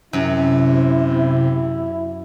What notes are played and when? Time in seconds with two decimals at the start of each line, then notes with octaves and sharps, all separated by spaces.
0.13 F#2 C3 E4